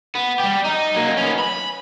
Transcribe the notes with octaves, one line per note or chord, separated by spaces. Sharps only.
B3
G3 G4
D#4
F#3 A#3
B3 C#4
B5